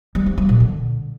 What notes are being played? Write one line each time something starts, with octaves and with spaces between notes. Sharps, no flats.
G3
C4
G3
A#2
D3